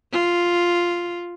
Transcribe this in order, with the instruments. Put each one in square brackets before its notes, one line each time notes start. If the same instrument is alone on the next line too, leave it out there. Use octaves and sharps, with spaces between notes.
[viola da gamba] F4